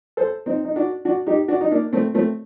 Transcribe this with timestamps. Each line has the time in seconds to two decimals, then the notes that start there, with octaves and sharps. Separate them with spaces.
0.17 A4 C5
0.46 C4 D#4
0.65 D#4
0.76 D4 F#4
1.05 D4 F#4
1.27 D#4 G4
1.48 D4 F#4
1.61 D#4
1.71 A#3 D4
1.93 A3 C4
2.14 A3 C4